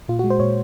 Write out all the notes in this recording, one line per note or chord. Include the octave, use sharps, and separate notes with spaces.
A#2 F4
F#4
G#3
C5
A#2 C#5